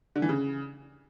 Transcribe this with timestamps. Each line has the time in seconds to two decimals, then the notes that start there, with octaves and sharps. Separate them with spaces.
0.16 D3
0.22 E3
0.29 C#3